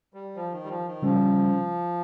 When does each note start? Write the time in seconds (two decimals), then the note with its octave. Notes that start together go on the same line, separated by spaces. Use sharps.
0.14 G3
0.35 F3
0.52 D#3
0.64 G3
0.69 F3
0.86 D#3
1.02 C#3 F3 G3 C#4